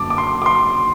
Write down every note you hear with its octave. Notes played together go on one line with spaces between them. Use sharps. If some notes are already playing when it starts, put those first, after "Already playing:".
Already playing: F#1 F#2 D3 F#3 A5 D6
D6
C6
D6
C6